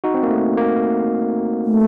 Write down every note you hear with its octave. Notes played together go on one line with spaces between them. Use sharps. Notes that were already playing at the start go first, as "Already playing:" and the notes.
D#4 F#4
C4
A#3
A3
A#3
A3